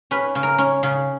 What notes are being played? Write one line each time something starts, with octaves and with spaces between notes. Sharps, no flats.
C#4 B4
C#3
A#4
C#4
C#3